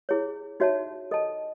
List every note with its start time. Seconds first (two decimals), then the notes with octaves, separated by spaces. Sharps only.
0.09 E4 G#4 C#5
0.60 D#4 F#4 C#5 E5 A5
1.11 A4 D#5 A5